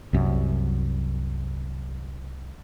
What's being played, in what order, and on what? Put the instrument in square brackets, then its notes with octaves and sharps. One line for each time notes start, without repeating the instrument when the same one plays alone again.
[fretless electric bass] C2 F#2